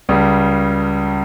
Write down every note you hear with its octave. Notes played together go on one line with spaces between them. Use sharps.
C#2 C#3 G3